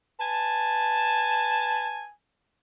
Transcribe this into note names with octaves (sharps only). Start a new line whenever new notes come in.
B4 G#5 A5